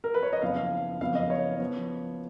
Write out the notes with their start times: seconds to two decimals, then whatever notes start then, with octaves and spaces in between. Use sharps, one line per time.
0.04 A#4
0.14 B4
0.23 C#5
0.33 D#5
0.42 F#1 F2 F3 B3 F5
0.56 F5
1.01 F#1 F2 F3 B3 F5
1.15 D#5
1.30 C#5
1.59 F3 B3